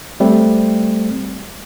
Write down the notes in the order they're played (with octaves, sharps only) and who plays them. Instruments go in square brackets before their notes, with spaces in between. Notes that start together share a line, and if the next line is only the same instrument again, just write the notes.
[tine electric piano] G3 A3 C4